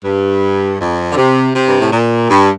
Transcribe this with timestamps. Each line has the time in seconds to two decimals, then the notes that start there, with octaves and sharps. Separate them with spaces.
0.04 G2
0.80 F2
1.12 D3
1.17 C3
1.55 C3
1.68 G2
1.80 A2
1.92 A#2
2.30 G2